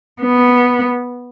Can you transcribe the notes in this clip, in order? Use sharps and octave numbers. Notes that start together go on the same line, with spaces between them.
B3